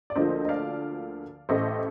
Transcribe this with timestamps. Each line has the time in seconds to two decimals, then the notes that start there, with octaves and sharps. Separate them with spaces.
0.10 D5
0.16 D2 D3 F3 A#3 C5 D#5
0.45 D#5
0.49 D5 F5
1.49 A1 A2 A3 C5 D#5